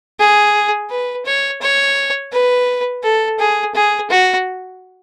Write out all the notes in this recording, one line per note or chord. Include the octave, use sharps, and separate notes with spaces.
G#4
B4
C#5
C#5
B4
A4
G#4
G#4
F#4